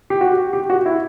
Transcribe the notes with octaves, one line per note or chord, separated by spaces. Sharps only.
G4
F#4
G4
F#4
E4